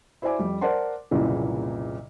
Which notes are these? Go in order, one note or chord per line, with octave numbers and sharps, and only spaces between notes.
E4 C5 D5 E5 G#5 D6
F2 G3
A#4 C5 D5 F#5 A5 C6
F#1 C2 A#2 C#3 E3